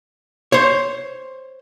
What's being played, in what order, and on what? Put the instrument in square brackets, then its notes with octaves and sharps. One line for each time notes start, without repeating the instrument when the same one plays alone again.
[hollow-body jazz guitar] C5 C#5